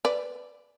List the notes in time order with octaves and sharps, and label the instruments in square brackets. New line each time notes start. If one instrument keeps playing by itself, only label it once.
[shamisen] B4 D5